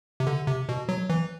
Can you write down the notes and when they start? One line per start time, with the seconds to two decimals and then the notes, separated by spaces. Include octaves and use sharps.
0.20 C3
0.27 D3
0.47 C3
0.69 B2
0.89 F#3
1.10 E3